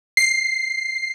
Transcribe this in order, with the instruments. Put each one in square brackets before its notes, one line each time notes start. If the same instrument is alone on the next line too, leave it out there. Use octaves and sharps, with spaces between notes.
[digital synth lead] C7